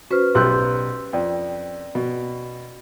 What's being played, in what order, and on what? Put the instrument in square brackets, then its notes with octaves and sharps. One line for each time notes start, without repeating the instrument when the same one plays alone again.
[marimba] C#4 B4 C5 [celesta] F#4 F6
[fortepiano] B1 G3 F#6 [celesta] C6 E6 G6
[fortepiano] F2 [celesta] D5 G5
[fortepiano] B2